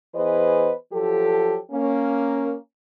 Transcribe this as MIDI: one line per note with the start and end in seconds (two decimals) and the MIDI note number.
0.15 0.72 52
0.15 0.72 59
0.15 0.72 68
0.15 0.72 71
0.15 0.72 72
0.15 0.72 75
0.92 1.57 53
0.92 1.57 54
0.92 1.57 67
0.92 1.57 69
1.72 2.55 58
1.72 2.55 61